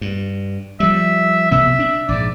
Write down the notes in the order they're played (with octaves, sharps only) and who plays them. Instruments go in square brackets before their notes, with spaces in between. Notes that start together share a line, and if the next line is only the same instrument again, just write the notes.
[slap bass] G2
[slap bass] F3 G3 [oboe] E5
[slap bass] B1 C3 B3 [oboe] E5
[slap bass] D4
[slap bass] A#1 G#2 [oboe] D5